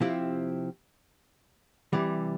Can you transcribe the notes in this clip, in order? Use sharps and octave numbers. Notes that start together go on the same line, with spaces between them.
C3 F3 C4 E4 G4
C3 E3 G3